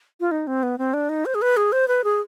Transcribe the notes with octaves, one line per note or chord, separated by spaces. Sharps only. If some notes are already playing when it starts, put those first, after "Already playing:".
F4
D#4
C4
B3
C4
D4
D#4
C5
G#4
B4
G#4
C5
B4
G#4